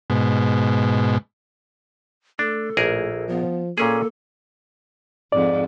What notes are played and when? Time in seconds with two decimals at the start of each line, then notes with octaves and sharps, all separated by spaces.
0.10 G#2 B2
2.39 A3 D4 A4
2.77 A#1 A2 G#4 A#4
3.29 F3 B3
3.78 A#2 A#3 C#4 G#4 A4
5.32 F2 G#2 D5